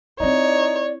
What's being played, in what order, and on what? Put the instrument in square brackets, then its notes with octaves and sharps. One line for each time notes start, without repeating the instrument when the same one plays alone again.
[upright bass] C4 E4 [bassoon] D#4 [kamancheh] C#5 [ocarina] D5